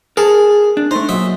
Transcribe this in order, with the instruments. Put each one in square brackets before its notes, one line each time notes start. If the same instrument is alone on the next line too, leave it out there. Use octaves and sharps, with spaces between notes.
[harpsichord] G#4 [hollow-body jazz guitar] A#4 A5
[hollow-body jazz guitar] D4
[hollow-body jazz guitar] A3 D#4 [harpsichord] C5
[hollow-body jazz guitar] A#2 F#3 [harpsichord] D#5 E5